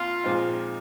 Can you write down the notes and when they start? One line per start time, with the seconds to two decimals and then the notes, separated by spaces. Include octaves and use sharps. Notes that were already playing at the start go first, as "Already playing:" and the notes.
Already playing: F2 A#3 F4
0.24 A#2 F3 G#3 C4 D#4